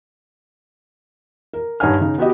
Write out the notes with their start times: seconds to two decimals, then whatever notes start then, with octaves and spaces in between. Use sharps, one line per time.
1.53 A#4
1.80 G2 D#4 C#5 F#5 G#5 F6
2.00 C#3 D#4
2.18 B3 F#4 G4 D#5